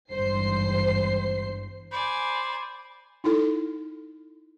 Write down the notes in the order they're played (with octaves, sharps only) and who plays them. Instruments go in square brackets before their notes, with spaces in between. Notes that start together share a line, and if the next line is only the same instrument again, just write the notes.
[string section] G#1 E2 G2 C5 C7
[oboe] C5 [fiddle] D5 G#5 [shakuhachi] B5
[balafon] D#4 E4 A4